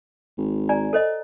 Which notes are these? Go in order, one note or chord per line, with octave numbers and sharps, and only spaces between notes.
G#1
D5 G#5 A#5
A4 C5 D#5